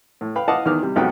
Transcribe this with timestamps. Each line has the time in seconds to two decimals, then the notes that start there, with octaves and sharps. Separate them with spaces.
0.21 A2
0.36 B4 F5 G5 B5
0.48 D#5 F5 F#5 A5 D6 D#6
0.65 E2 D#3 B4 D6 F6
0.83 C3 G3
0.96 B1 F2 G#2 D#4 F#4 G5